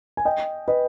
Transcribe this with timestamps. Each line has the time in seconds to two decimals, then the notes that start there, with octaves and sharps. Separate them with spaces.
0.17 G#5
0.25 D#5 G5
0.68 B4 D#5